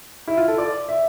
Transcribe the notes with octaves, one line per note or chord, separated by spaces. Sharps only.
E4
F4
A4
D5
E5